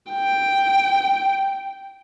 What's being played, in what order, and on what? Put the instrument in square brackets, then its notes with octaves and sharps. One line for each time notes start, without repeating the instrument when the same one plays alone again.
[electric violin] G5